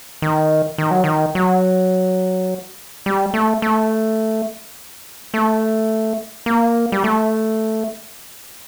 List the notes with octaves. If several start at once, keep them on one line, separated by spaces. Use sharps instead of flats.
D#3
D#3
F#3
D#3
F#3
G3
A3
A3
A3
A#3
G3
A3